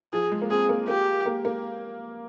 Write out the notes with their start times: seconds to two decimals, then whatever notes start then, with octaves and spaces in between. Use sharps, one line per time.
0.13 F3 G#4
0.32 G#3
0.42 A#3
0.50 C4 G#4
0.69 A#3
0.88 A#3 G4
1.26 A#3
1.45 A#3